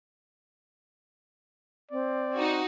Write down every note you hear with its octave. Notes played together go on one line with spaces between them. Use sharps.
C4 D5
D#4 F#4